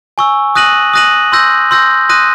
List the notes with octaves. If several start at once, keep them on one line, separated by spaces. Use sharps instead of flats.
G#5 C#6 E6
D#6 F#6 A#6 D#7 F#7
D#6 F#6 A#6 D#7 F#7
C6 E6 G6 A#6
C6 E6 G6 A#6
C6 D#6 F#6 A#6 D#7